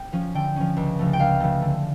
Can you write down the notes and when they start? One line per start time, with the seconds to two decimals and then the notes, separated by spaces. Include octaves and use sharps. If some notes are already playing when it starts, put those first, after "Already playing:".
Already playing: G5
0.13 F3 C#4
0.35 D3 G5
0.56 F3 C#4
0.76 C#2
0.99 C#3 F3 A3
1.13 G5
1.19 C#2 F5
1.40 C#3 F3 A3
1.62 D3